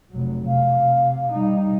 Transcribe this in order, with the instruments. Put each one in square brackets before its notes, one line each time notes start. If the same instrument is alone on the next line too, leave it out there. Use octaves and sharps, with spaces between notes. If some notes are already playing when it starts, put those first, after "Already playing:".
[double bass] F1 F#3
[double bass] C3 [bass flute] F5
[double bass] G3 D#4